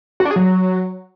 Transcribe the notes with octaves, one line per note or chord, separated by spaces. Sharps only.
F#4
D4
G#4
F#3